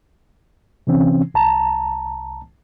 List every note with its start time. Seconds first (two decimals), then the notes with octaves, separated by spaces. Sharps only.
0.87 C3 E3 C4 C#4
1.34 C2 A5 A#5